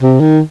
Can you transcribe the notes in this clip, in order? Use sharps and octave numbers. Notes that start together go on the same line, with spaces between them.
C3
D#3